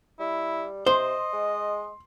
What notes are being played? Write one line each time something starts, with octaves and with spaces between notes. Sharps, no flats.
G3 E4
C3 C5 D#5 C6
G#3